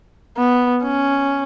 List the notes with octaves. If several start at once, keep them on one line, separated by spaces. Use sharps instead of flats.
B3
C#4